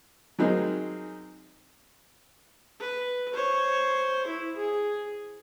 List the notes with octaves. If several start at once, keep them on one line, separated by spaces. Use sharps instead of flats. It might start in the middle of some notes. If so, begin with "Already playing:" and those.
F#3 G#3 C4 D#4 G#4 A#4
B4
C5 C#5
E4
G#4